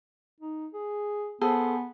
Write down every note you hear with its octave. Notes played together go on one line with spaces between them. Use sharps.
D#4
G#4
B3 G#4 A4 C5